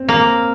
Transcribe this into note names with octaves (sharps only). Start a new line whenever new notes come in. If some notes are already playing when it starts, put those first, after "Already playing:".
Already playing: C4
A#3